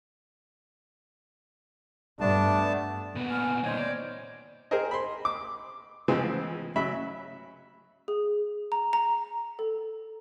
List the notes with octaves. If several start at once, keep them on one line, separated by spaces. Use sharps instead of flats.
G2 A3 B3 D4 A5
A#2 B3
G#5 F6
A#2 D#3 C5 C#5 D#5
D5
G4 G#4 A#4 C5 D#5
B5 C6
D6
C#3 E3 F3 G#3 B3 C4
C#3 F#3 E5 B5
G#4
A#5
A#5
A4